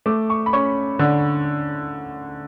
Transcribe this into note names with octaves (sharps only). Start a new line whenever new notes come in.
A3 D6
C#6
B5
C#4 C#6
D3